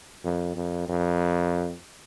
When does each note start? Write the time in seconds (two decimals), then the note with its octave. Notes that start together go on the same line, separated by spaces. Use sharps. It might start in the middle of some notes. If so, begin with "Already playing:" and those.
0.24 F2
0.56 F2
0.88 F2